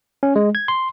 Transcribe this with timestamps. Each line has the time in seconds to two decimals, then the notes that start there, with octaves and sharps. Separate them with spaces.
0.23 C#4
0.36 G#3
0.55 G#6
0.68 C6